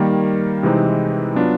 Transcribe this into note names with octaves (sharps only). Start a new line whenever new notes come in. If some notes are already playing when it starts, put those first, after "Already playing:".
Already playing: D#3 G3 A#3
C3 E3 G#3 C4 D#4
F#3 B3 D4 F4